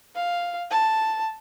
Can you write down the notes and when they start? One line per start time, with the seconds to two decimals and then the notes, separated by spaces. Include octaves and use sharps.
0.15 F5
0.71 A5